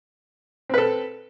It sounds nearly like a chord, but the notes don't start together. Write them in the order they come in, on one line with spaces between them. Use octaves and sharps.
C4 B4 A4